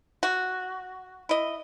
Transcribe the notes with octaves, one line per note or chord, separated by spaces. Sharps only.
F#4
E4 D#5